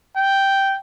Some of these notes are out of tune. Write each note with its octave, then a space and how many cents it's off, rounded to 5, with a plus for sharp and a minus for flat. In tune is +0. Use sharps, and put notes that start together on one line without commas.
G5 -5